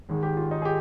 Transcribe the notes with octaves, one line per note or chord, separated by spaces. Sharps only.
G#1 G#2 D#3 G#3
G4
F4
D#4
G#4
G4